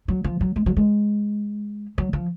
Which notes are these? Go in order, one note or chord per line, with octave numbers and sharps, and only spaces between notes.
F#3
F3
F#3
G#3
F#3
G#3
F#3
F3